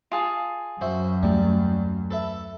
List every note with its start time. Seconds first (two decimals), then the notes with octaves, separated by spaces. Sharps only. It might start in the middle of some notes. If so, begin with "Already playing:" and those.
0.11 F4 G#4 A5
0.81 F#2 F#4 C5 E5
1.23 D#2 G3 A3
2.11 A4 B4 E5